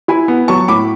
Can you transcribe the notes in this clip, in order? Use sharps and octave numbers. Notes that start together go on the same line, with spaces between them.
E4 G#5 B5
B3
F#3 A5 C#6
A2 B5 D6